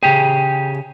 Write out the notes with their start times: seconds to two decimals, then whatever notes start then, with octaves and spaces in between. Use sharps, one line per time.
0.03 C#3 G4 G#4 G5